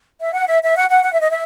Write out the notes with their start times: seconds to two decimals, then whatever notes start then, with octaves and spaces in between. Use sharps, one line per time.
0.20 E5
0.33 F#5
0.46 E5
0.62 E5
0.76 F#5
0.89 F#5
1.03 F#5
1.12 E5
1.20 D#5
1.30 E5